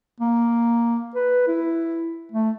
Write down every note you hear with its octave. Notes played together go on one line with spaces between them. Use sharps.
A#3
B4
E4
A3